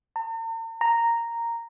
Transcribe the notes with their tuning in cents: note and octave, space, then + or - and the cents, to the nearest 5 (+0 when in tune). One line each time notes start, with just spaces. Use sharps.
A#5 -45
A#5 -5